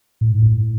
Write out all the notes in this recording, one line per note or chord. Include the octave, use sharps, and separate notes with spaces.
A2
G#2
A2